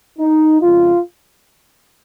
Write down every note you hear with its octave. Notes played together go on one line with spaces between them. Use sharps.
D#4
F2 C#3 G#3 F4